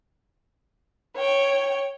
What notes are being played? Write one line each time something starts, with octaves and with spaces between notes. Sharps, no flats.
C#5 G5